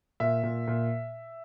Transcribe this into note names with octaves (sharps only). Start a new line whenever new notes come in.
A#2 E5
A#2
A#2